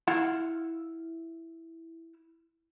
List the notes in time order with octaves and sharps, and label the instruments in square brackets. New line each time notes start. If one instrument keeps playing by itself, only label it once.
[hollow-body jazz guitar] E4 F5 F#5